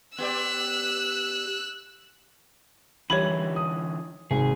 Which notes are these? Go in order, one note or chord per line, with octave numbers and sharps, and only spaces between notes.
B3 G4 D5 E6 F#6
D3 E3 G3 C#5 B5 G#6 F#7
D#6
G#1 C3 G#4